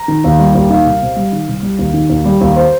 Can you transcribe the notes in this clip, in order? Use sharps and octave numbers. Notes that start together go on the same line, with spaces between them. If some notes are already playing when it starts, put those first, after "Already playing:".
Already playing: A#5
D#3
D#2
G3
D#2
D#3 F5
C2
C3
G3
D#3
C2
G3
D#2
D#3
D#2
G3
D#2
C5